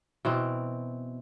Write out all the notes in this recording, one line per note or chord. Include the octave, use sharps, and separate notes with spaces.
B2 E3 C4